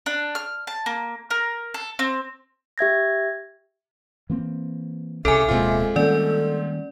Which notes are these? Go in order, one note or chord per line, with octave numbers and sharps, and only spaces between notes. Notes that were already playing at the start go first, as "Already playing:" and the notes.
D4
F6
A5
A#3
A#4
A4
C4
G4 E5 G#6 A#6
E3 A#3 C4
C2 C#3 A4 E5 G#5 D7
D1 B2 G#3 A#3 C4 F4
D#3 G3 A#3 C#4 A4 D5